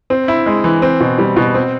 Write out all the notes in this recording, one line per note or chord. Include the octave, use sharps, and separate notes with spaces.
C4
E4
G#3
E3
C4
B2
G3
B2
C4